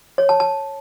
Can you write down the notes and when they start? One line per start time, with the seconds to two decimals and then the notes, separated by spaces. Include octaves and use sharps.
0.18 C#5
0.29 A5
0.40 A5